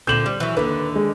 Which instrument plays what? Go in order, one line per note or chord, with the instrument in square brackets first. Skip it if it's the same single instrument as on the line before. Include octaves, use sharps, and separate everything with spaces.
[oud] A#2 D3 C4 [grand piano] G6 E7 F#7
[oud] G3
E3 F#3
[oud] D#2 D3 [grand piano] B4
[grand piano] G#3